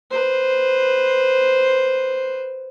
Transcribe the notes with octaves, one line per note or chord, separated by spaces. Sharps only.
B4 C5